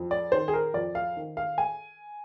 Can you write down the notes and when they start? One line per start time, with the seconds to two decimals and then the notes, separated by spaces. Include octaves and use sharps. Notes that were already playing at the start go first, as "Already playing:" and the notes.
Already playing: F2
0.11 D5
0.32 D#3 C5
0.48 G#4
0.53 A#4
0.74 F2 D5
0.95 F5
1.16 D#3
1.37 F5
1.58 G#5